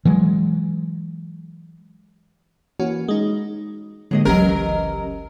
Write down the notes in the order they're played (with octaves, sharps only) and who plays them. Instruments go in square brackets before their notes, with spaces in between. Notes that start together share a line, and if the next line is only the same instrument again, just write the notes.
[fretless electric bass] E3 F#3 G#3
[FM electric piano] E3 A#3 C#4 F#4
G#3 D#4
[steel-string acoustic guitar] A2 G#4 D#5 [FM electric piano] D3 G#3 A#3
[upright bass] G1 C#2 [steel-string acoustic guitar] E3 F#3 [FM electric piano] C#4 G4 D#5 [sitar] A#4